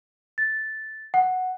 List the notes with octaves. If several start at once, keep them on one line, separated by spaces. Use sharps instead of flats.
A6
F#5